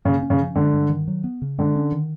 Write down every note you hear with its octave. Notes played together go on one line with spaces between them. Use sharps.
C#3 A#3
C#4
C#3
F3
D3 G#3
G2
D#3
F#3
B3
C#3
D3 G#3
C#4
D#3